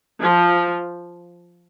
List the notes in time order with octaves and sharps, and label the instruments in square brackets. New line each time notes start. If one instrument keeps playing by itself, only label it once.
[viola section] F3